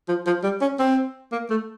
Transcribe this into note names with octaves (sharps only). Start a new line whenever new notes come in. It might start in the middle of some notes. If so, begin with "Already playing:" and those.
F3
F3
G3
C#4
C4
A#3
A3